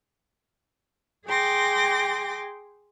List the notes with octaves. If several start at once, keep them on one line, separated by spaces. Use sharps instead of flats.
G#4 G5 C6 D6 A#6